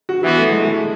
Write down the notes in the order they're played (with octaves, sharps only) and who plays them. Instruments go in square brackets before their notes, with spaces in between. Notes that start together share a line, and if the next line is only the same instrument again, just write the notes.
[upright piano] F#4
[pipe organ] E3 B3 F#4 [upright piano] E4
[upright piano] A3
G#3
A3